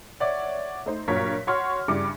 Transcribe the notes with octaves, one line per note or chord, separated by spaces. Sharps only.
C#5 D5 E5 F#5
A3 D#4 C5
G2 A#2 F#3 A#4 C#5 B6
F#4 C#5 C6 C#6 F6
G2 C#3 G3 E4 D6 C#7